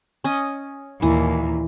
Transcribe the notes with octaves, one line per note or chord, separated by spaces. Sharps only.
C#4 D#5
D#2 A#2 E3